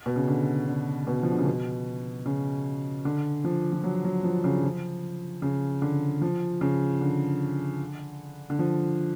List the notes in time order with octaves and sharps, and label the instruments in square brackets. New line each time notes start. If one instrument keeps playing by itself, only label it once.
[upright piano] B2
C#3
D3
D3
B2
F3
D3
C#3
B2
C#3
D3
F3
F3
F#3
F#3
F3
C#3
D3
F3
C#3
D3
F3
C#3
D3
D3
F3